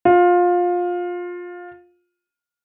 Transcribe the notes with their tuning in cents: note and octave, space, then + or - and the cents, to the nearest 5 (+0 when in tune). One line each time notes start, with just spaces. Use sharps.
F4 +20